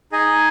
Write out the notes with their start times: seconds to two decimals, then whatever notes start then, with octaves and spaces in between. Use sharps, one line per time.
0.12 D#4 G#4 D#5 G#5